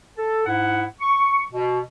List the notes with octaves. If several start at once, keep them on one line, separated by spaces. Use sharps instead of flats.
A4
G#2 E4 F#5
C#6
B2